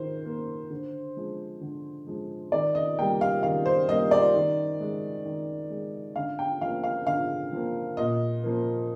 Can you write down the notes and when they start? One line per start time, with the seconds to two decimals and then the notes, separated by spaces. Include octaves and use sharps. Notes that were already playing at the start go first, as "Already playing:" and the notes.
Already playing: D#3 A#3 C5
0.25 A#3
0.70 D3
1.17 F3 G#3
1.61 D3
2.07 F3 G#3
2.52 D#3 D5
2.75 D#5
2.99 G3 A#3 G5
3.21 F5
3.43 D#3 F5
3.66 C5
3.88 G3 A#3 D#5
4.11 D5
4.35 D#3
4.80 G#3
5.25 D#3
5.70 G#3
6.16 D3 F5
6.39 G5
6.61 F3 A#3 F5
6.84 F5
7.07 D3 F5
7.52 F3 A#3
7.97 A#2 D#5
8.43 F3 A#3